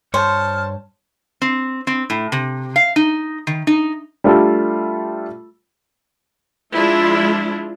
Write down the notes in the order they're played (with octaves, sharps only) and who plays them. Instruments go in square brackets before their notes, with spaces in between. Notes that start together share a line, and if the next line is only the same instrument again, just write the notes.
[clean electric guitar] G2 C#5 [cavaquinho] C5 [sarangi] A5 [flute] F6
[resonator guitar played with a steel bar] C4
C4
A2
C3
F5
D#4
D#3
D#4
[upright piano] G3 A3 D4 F4 G4 A4
[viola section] F3 G#3 D4 E4 F4